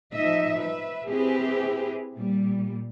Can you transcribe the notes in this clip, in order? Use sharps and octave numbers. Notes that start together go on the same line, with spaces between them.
F3 D#4 D#5 E5
B4 E5
C4 E4 G4 G#4 B4
A#2 G3